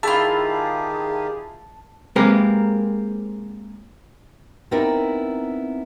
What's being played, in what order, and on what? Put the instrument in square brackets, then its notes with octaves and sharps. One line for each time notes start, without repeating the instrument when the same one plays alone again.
[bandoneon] D#3 G4 [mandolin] E4 F4 [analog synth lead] G#4 [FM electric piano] A5
[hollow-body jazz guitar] G#3 A#3 C4 G4 A#4 B4
[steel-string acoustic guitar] B3 C4 D#4 E4 A#4 D5